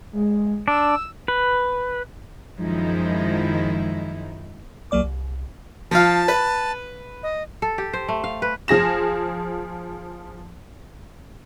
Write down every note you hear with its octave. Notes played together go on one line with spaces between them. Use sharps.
G#3
D4 E6
B4
F#2 D#3 F3 G#3 D#4 E4
C2 F#3 A#3 D5 D6
C2
F3 F5 A5
B4
D#5
A4
G4
C5
A3
F5
B4
F3 G#4 A#6 E7